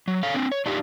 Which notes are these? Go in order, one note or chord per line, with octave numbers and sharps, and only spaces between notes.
F#3
A4 C#5 F5
C4 D4
C#5
D4 D#4 F4 G4